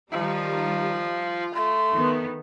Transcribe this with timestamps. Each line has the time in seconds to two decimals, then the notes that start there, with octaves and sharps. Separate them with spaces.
0.12 D#3 F3 G3 D#4
1.24 F4
1.55 A3 C6
1.93 D#3 B3